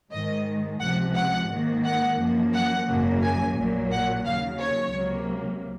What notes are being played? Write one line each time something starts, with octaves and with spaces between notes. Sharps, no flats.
G#2 D#3 G#3 D#5
C#2 C3 F3 F#5
F#5
G#2 D#3 A#3
F#5
F#2 F3 A#3
F#5
G#1 F#2 C#3 F#3 A#3
G#5
A#1 A#2 F#3 A#3
F#5
D#2 C#3 F#3 F5
C#5
C#2 C3 F#3 A#3